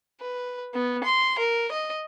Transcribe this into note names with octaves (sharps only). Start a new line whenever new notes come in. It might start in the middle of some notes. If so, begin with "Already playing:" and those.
B4
B3
C6
A#4
D#5